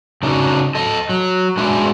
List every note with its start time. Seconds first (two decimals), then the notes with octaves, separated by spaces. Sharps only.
0.23 C#3 D4 D#4 F#4
0.75 A4 D#5
1.09 F#3
1.57 G#3 D4 E4 F#4 G#4